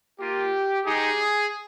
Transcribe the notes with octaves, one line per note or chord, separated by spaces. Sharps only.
A#3 F4 G4
G#3 D#4 G4 G#4